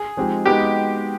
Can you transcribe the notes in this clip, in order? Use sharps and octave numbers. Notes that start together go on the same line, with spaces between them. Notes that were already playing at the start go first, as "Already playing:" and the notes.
Already playing: G#4
F3 G#3 C4 D#4 G4
G#3 B3 D#4 F#4 G4